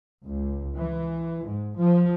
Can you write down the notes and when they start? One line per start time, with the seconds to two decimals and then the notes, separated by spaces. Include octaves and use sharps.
0.23 C#2
0.76 E3
1.47 G#2
1.76 F3